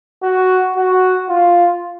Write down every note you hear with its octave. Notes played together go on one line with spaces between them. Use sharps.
F#4
F#4
F4